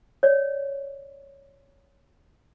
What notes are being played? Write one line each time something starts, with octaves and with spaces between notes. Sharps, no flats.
C#5 D5